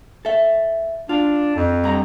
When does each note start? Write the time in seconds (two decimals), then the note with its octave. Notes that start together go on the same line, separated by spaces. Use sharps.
0.25 A4 E5
1.09 D4 F4
1.56 F2
1.84 G2 A#5